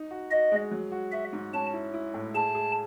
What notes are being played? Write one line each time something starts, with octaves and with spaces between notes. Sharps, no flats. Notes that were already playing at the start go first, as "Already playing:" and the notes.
Already playing: D#4
F#4
F#4 D#5
G#3
F#3
F#4
F#4 E5
G#2
C#4 A5
E4
E4
A2
G#4 A5
G#4